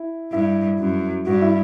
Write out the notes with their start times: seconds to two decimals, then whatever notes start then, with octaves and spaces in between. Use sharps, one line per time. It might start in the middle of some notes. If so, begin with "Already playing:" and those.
Already playing: E4
0.32 G2 E4
0.79 F#2
1.26 G2 F#4
1.41 E4